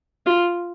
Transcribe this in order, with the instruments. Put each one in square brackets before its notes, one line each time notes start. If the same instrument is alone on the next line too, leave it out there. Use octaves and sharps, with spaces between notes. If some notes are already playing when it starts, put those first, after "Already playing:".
[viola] F4